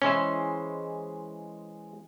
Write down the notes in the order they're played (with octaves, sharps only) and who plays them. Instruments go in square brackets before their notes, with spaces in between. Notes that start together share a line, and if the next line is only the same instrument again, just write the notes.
[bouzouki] E3 G#3 C5 [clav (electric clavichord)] C#4 E5